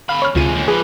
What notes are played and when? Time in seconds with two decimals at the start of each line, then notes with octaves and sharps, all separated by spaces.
0.09 D3 F5 B5
0.22 C#5 F6
0.35 D2 C3 G#3 F4 D#7
0.54 D#2 D3
0.68 F3 G#4 B4